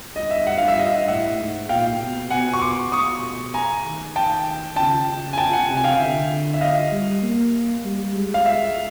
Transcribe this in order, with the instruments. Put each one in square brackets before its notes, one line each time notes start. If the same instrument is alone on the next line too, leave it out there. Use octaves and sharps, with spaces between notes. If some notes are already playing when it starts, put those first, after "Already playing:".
[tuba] G2 [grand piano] D#5
[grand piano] E5
[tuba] G2 [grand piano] F#5
[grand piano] F5
E5
[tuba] G2 [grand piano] D#5 F5
[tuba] A2 [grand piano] E5 F#5
[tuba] G#2
[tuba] A#2 [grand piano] F5 G5
[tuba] B2
[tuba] B2 [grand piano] F#5 G#5
[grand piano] C#6
C6 D6
[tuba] B2 [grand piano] C#6 D#6
[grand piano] G#5 A#5
[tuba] D#3
[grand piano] G5 A5
[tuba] C#3 [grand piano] G5 A5
[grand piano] G#5
G5 A5
F#5 G#5
[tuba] C3
[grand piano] G#5
F5 G5
[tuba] D3 [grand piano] E5
[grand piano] E5
D#5 F5
[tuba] G3
A#3
G3
G#3
[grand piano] F5
E5